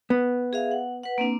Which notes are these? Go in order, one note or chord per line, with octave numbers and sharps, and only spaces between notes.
B3
G#4 E5 F5
F#5
B4 F#5
A#3 C4 D4